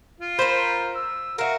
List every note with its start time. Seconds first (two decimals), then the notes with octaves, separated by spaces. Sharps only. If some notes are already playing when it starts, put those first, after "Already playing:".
0.20 F4
0.39 A#4 C5 B5
0.95 E6
1.38 F#4 A#4 E5 F5